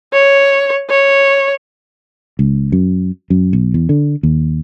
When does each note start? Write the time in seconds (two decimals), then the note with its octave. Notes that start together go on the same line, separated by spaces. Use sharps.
0.13 C#5
0.90 C#5
2.39 C#2
2.72 F#2
3.30 F#2
3.53 B1
3.74 E2
3.89 D3
4.23 D#2